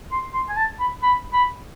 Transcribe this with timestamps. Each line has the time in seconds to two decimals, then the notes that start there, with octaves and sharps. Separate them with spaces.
0.11 C6
0.34 C6
0.49 G#5
0.57 A5
0.80 B5
1.03 B5
1.33 B5